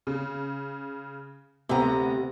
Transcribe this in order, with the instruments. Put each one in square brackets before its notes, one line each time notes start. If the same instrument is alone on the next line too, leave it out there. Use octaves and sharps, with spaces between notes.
[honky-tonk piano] C#3
[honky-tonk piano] D2 B3 [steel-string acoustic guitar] C3 A#5